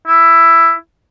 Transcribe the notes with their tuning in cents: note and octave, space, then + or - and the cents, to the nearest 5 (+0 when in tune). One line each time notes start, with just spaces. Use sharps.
E4 +10